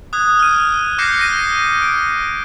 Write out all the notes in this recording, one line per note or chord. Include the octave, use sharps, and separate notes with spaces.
D#6 F#6 G#6
F6 D#7
D6 F6 G6 A#6 C7 C#7
A#6 D#7
D7